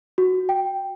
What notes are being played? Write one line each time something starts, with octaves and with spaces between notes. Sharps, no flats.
F#4
G5